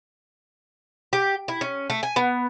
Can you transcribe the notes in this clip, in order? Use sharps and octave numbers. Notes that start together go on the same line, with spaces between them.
G4
E4
C#4
A3
G#5
B3